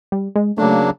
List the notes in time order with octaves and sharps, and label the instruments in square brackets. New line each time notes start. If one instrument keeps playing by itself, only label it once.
[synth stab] G3
G#3
[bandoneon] C#3 F#3 A#3 D4 [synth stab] A3